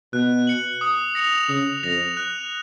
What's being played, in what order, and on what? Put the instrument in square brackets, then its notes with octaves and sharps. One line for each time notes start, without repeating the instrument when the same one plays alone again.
[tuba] B2 [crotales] F#6
[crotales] C#7 F#7
D#6
A#6 C#7 F7
[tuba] C#3 [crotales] D#6
[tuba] F2 [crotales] A#6 F7
[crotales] F#6